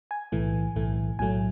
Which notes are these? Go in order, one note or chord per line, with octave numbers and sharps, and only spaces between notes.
G#5
B1 A2 E3 A3
B1 A2 E3 A3
B1 A2 F#3 A3 G#5